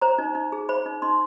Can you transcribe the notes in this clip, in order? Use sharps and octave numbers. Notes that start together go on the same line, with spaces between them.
C5 A#5
D#4
D#4
G#4
C5 B5
D#4
D#4 C6